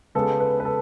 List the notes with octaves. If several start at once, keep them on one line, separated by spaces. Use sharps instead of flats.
C#3 G#3 B3 A4
B4
B4
A4